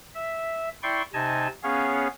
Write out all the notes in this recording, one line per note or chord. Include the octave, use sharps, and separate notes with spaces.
E5
E4 D5 G5 C6 C#6
C3 D#4 D#5 G#5 A5
B3 C#4 G#4 C#5 F5